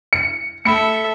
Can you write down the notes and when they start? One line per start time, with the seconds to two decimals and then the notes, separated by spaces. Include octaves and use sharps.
0.13 C#7
0.65 A3 A4 E5 B5 C#7